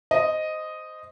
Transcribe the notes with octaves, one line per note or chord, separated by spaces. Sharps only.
C5 D#5